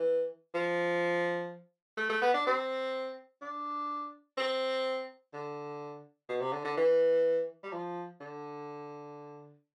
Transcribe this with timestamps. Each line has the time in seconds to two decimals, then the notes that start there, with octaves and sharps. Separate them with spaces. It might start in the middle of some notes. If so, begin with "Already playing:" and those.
Already playing: E3
0.54 F3
1.97 A3
2.09 A3
2.21 B3
2.34 D4
2.46 C4
3.41 D4
4.37 C4
5.33 D3
6.29 B2
6.41 C3
6.53 D3
6.65 D3
6.77 E3
7.63 G3
7.72 F3
8.20 D3